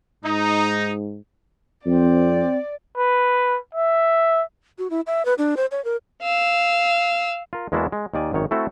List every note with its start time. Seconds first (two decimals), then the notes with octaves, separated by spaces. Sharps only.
0.25 G#2 D#4
1.86 F2 C4 D5
2.97 B4
3.75 E5
4.79 F#4
4.90 E4
5.07 E5
5.25 B4
5.38 D4
5.57 C5
5.72 C#5
5.85 A#4
6.23 F5 E6
7.53 F4 A#4
7.72 E2 G#3 A#3 E4 F#4 A5
7.92 G#3
8.14 D#2 D#3 D5 G#5
8.32 G#1 F#2 D#3 C#5
8.51 A3 C4 E4 F#4 A4